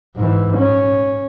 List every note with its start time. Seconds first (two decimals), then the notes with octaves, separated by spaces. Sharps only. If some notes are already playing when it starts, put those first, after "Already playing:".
0.16 G#2 E3
0.57 C#4